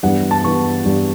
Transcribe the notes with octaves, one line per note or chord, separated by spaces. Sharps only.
G2 E3 G3 B3 F#5
A5
G2 E3 G3 B3 C#6
G2 E3 G3 B3